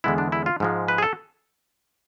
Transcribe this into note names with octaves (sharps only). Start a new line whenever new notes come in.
E2 D3 G#3 B3 E4
D4
E4
F4
G#2 F3 G#3
B4
G#4
A4